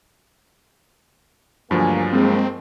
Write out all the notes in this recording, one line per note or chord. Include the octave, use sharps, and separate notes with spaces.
D2 G2 F3 F#3 A#3 G#5
G#3 A#3 C4